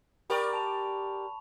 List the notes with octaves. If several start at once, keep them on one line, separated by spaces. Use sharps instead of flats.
G4 A#4 D5 B5 C#6
A5 F7